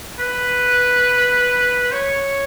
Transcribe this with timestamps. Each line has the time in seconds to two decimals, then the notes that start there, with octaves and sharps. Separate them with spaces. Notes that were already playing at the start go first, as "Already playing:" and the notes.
0.20 B4
1.92 C#5